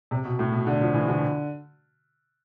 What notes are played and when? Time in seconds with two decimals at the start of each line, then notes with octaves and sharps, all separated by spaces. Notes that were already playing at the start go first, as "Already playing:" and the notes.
0.11 C3
0.25 B2
0.39 A2
0.52 B2
0.67 D3
0.81 F3
0.94 E3
1.08 D3